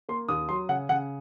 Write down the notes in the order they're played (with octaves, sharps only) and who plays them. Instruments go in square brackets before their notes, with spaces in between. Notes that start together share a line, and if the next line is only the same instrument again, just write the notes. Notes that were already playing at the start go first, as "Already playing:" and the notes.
[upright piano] A#3 C6
D#2 D#6
F#3 C6
C#3 F#5
C#3 F#5